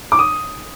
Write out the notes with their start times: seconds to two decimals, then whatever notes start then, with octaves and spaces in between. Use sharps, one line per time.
0.12 D6
0.19 D#6